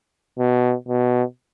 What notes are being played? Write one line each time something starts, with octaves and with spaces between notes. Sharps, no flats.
B2
B2